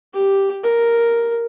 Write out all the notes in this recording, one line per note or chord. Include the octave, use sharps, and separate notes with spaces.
G4
A#4